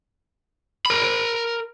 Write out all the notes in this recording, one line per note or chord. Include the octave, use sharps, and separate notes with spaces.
A#4 B5